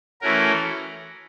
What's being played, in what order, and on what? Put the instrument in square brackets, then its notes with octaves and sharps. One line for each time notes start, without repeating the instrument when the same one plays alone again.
[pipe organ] E3 A3 C#4 F#4 A#4